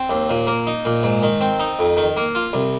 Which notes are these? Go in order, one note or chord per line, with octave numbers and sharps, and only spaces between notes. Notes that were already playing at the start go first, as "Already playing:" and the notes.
Already playing: C4
D#2
A#2
A#3
D#4
A#2
G#2
D#3
C4
D#4
F2
D#3
A#3
F4
C2